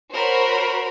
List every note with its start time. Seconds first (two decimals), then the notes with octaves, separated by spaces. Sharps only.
0.14 F#4 A#4 C5 C#5 B5